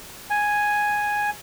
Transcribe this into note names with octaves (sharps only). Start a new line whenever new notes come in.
G#5